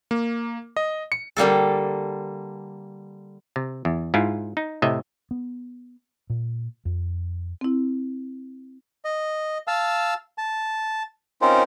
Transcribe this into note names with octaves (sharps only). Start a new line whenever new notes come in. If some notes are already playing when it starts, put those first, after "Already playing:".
A#3
D#5
C#7
D3 G3 A#3 A4
C3
E2
G#2 E4 F4
D#4
A2 C3 D#5 E5
B3
A#2
F2
C4 E4
D#5
F5 A5 E6
A5
C4 C#4 D#4 F4 A#4 C5